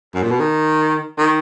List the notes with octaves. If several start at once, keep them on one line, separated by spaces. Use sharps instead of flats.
F#2
A#2
B2
D#3
D#3